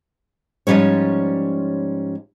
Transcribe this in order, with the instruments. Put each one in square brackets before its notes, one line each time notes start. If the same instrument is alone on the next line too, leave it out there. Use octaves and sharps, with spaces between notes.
[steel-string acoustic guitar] G#2 F3 G3 C#4 C#5